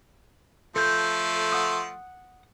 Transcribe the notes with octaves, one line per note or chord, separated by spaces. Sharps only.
F3 A3 A4 G6
F#5 D#6